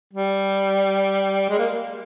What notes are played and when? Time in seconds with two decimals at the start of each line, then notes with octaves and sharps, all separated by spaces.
0.14 G3
1.49 G#3
1.58 A#3